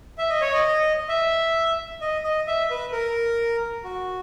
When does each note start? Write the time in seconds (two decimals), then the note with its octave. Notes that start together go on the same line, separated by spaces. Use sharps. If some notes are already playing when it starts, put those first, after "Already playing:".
0.18 E5
0.29 D#5
0.41 C#5
0.53 D#5
1.09 E5
2.01 D#5
2.24 D#5
2.47 E5
2.70 B4
2.92 A#4
3.84 F#4